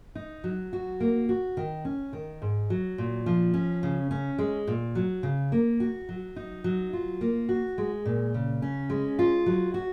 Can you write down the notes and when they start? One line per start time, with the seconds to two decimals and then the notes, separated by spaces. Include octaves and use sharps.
0.15 D#4
0.44 F#3
0.73 F#4
1.00 A#3
1.29 F#4
1.57 D#3
1.85 C#4
2.13 D#3
2.42 G#2
2.70 F#3
2.98 A#2
3.26 F3
3.54 C#4
3.83 C#3
4.11 C#4
4.38 G#3
4.67 A#2
4.95 F#3
5.23 C#3
5.52 A#3
5.80 F#4
6.09 F#3
6.36 D#4
6.64 F#3
6.93 F4
7.21 A#3
7.49 F#4
7.78 G#3
8.05 A#2
8.34 C#3
8.62 C#4
8.90 G#3
9.19 F4
9.46 F#3
9.74 F#4